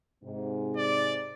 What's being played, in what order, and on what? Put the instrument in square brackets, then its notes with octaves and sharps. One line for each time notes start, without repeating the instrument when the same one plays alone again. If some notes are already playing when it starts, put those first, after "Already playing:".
[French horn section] G#2 C3
[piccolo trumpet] D5